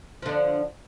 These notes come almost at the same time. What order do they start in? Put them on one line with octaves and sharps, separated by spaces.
F3 D3 D4